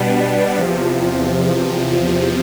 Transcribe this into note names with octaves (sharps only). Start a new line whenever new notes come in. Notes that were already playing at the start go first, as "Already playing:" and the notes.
Already playing: B2 G3 B3 D4
E2 C3 F3